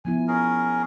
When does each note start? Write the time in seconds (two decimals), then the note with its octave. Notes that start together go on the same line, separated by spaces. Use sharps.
0.05 F3 B3 E4 G#5
0.28 C#4 G#4 A#4